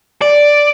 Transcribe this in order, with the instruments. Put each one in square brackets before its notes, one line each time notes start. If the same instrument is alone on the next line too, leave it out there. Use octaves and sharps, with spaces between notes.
[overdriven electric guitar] D5